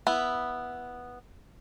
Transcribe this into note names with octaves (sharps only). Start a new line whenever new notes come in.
B3 E4